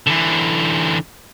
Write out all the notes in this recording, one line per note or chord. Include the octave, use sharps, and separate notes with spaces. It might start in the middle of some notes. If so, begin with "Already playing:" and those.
D3 E3